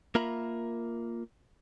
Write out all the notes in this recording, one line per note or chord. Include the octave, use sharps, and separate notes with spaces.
A#3 F4 A#4 E5 A#5 B5